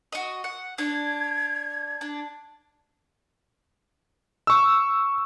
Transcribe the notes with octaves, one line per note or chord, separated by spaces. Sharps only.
F#4 D#5
F#5
D4 G#6
D4
C#6 E6